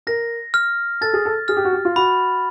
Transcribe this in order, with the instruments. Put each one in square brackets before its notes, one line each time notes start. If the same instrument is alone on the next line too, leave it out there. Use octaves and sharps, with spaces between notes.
[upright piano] A#4 [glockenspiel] A#6
[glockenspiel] F6
[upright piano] A4 [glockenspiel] A6
[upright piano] G#4
A4
[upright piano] G#4 [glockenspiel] F6
[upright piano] G4
F#4
G4
F4
[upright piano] F#4 [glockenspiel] B5